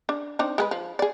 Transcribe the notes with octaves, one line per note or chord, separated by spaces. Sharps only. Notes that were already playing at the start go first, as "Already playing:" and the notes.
D4
C4 D4 D#4
G#3 G#4 B4
F3
G#4 D5